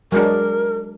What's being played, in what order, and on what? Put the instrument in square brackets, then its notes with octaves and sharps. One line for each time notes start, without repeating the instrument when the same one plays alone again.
[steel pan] F#3 G#3 D4 [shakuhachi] A#4